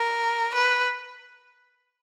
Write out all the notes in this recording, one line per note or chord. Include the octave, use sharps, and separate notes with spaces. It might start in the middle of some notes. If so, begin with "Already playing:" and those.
Already playing: A#4
B4